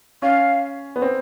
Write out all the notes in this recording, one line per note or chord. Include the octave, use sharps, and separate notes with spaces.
C#4 F5
B3
C4